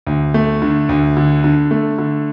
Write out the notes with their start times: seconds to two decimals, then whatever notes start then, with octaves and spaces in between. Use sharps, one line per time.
0.07 D2
0.34 A3
0.62 D3
0.89 D2
1.17 D3
1.44 D3
1.71 A3
1.98 D3